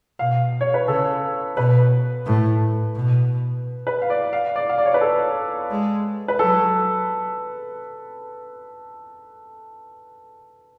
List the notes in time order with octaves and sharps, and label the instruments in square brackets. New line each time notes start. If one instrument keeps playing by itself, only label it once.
[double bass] B2 [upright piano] F5
[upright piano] C#5
B4
[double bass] C#3 [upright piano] A4
[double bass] B2 [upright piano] B4
[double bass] A2
B2
[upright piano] B4
F5
D5
F5
D5
F5
D5
C#5
B4
A4
[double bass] G#3
[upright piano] B4
[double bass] F#3 [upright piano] A4